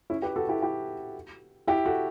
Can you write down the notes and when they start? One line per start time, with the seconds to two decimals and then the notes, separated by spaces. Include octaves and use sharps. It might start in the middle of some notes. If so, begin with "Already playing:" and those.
0.10 C#4 E4
0.22 G4 B4
0.36 F#4 A4
0.49 E4 G4
0.62 E4 G4
1.67 E4 G4
1.86 F#4 A4